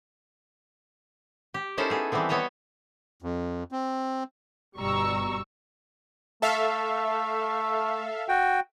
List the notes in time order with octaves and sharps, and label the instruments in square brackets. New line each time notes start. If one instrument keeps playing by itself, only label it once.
[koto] G4
C#4 D#4 E4 A4 A#4 C5
B3 G#4 A4
E3 G3 A3 B3 C4
B3 C#5 D#5 E5 A#5
[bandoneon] F2
C4
[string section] G1 B2 G3 A#5 C#6 E6
[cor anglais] A3 [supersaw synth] A4 E5 F5
[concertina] F#4 G5